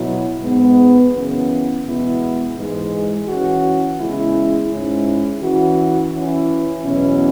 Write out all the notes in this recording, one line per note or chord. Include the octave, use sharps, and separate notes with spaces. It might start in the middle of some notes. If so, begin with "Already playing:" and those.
Already playing: B2 F#3 E4
G#2 G#3 B3
F#2 C#3 E3 B3
E2 B2 G#3 B3 E4
G#2 E3 G#3
E3 C#4 F#4
E2 C#3 G#3 E4
G#2 G#3 C#4 E4
E3 C#4 F#4
E3 C#4 E4
E2 B2 F#3 C#4 E4